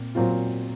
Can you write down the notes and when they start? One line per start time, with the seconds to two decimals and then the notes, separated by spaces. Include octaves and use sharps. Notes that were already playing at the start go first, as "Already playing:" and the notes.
Already playing: A#2 C4
0.15 A#2 F#3 C4 F4